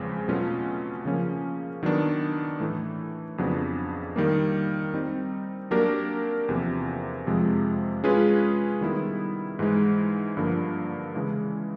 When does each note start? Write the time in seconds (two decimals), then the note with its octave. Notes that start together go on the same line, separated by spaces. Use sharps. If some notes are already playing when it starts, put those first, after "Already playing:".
Already playing: E2 C#3 F3 G#3 C4
0.28 B2 F#3 A3 C#4 F4
1.05 C#3 F3 A#3 C#4
1.83 D#3 F#3 B3 D4
2.60 A2 E3 A3
3.38 F2 C#3 F#3 B3 D4
4.16 D#3 G3 A#3
4.94 G3 C4 D#4
5.71 F#3 A#3 D4 G4 A#4
6.49 E2 C3 F3 A#3
7.26 F2 C3 F3 G#3
8.04 G#3 C#4 F4 G#4 B4
8.81 D#3 G3 B3 E4 G#4
9.59 G#2 E3 G#3
10.37 G2 D3 F3 A#3
11.14 C#3 E3 G#3